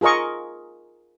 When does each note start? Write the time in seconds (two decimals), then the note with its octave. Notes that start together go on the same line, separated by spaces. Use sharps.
0.01 F4 G#4 A#4 D#5 C#6